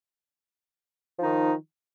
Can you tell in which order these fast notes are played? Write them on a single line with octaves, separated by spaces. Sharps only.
F3 D#4 D#3